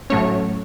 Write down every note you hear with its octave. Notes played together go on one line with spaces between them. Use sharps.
A2 F#3 A3 C#4 C#5